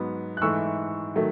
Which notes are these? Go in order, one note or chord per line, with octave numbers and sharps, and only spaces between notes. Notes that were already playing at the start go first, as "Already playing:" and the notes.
Already playing: G#2 F#3 B3
F#6
G#2 E3 A3 C#6 E6
D#3 F#3 A3